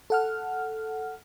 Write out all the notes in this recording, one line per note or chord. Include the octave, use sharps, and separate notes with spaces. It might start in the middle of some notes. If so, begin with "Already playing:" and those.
A4 F#5 F6